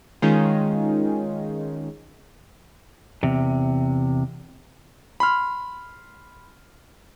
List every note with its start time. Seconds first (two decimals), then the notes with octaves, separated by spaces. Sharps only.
0.22 D#3 G#3 C#4 D#4 F4 G#4
3.23 E2 C3
5.20 B5 C6 F6